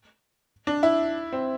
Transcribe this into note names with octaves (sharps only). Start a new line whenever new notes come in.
D4
E4
C4